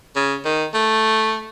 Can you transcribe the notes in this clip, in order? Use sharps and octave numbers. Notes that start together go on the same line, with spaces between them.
C#3
D#3
A3